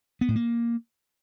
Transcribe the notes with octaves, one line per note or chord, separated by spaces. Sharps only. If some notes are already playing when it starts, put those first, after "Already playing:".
B3
A2
A#3